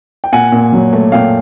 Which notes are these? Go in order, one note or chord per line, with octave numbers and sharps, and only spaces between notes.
G5
A#2 F#5 G#5
A#2
F#3
A3
A#2 F5 G5